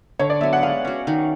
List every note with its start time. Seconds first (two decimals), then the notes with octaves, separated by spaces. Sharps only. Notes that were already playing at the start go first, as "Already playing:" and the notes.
0.19 D3 C#5
0.30 D5
0.41 F#3 B3 E5
0.53 F#5
0.63 G#3 F5
0.85 C#4 F#4
1.07 D#3